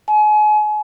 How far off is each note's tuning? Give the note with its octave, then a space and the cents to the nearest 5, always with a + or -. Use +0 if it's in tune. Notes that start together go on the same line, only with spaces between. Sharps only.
G#5 +35